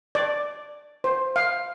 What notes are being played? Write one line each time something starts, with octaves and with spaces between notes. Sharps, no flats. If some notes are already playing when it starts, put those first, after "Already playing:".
D5
C5
F5